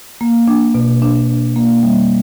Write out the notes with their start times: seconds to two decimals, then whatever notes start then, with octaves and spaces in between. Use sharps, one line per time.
0.21 A#3
0.48 D4
0.74 B2
1.02 D4
1.29 D4
1.56 A#3
1.83 G3